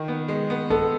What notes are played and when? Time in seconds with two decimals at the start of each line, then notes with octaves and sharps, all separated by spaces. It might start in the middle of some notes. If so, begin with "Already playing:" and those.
Already playing: D#3
0.08 B3
0.28 G#3
0.50 B3
0.70 B3 A4